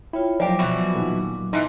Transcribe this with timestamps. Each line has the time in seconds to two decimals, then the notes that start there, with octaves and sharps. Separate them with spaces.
0.13 E4 F4 C#5 G5
0.40 F3 F#3 A#3 G4 D5 G5 D6
0.59 B2 E3 F#4
0.95 A#2 D#3
1.53 B2 E3 D#4 C6